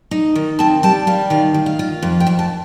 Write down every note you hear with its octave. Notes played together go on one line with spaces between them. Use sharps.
D#4
D#3
C4 A5
G3 A5
G3 F5
D#3 F5
D#3
F5
F4
F2
G5
F2
A5